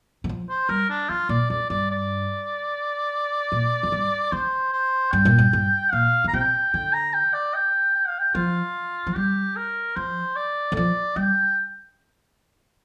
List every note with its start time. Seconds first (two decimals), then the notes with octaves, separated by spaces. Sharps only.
0.24 D3
0.29 F3
0.49 C5
0.69 G3 A#4
0.89 D4
1.09 F3 F4
1.29 A#2 D5
1.50 F2 D5
1.70 G2 D5
1.91 D5
3.52 A#2
3.83 F2
3.92 G2
4.32 D3 C5
4.72 C5
5.12 G2 G5
5.25 A#2
5.38 G2
5.53 G2
5.92 A#2 F5
6.24 D3 A#5
6.33 C3 G5
6.73 D3 G5
6.93 A#5
7.14 G5
7.33 D5
7.54 G5
7.94 G5
8.08 F5
8.19 G5
8.35 F3 F4
9.07 F3
9.15 G3 G4
9.56 A#4
9.96 F3 C5
10.36 D5
10.72 D3
10.76 F3 D5
11.16 G3 G5